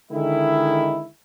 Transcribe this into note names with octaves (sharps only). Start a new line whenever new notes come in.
D3 D#3 G#3 E4